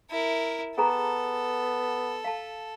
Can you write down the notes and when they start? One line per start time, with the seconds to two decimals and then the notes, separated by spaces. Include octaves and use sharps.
0.10 E4 A#4
0.78 B3 G#4 A4 G#5 A#5
2.25 F5 A5